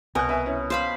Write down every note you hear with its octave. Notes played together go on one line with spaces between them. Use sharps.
C2 B2 C4 A#4 G#5 F#6
B4 E5 G#5
C#4 E4
C5 F5 B5